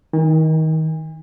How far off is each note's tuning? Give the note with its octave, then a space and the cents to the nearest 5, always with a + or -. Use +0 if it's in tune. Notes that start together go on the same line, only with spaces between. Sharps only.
D#3 +25 G#5 -45